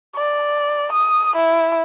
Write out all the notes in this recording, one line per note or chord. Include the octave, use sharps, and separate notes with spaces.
D5
D#6
E4